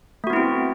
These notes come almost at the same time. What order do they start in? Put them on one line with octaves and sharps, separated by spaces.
A3 F#4 B3 E4 C4